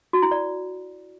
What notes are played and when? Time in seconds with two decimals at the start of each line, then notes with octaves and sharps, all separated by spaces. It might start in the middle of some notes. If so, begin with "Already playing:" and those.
0.13 F#4
0.22 E4
0.31 D5